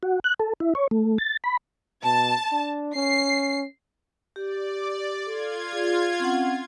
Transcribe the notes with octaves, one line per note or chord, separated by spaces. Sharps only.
F#4
F#6
A4
E4
C#5
A3
A6
B5
B2 A5
D4
C#4 C7
G4 D5
F4 A4 G#6
G#4 D5
C4 C#4 F#5